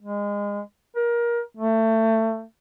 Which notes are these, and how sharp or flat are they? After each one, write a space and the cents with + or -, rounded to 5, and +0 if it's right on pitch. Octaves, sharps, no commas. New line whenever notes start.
G#3 -25
A#4 +25
A3 +25